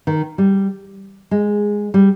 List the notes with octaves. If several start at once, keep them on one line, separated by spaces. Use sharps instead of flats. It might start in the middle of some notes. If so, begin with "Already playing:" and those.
D#3
G3
G#3
G3